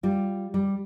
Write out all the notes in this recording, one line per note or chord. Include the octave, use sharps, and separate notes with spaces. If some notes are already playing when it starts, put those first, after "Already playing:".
G3 F4
G3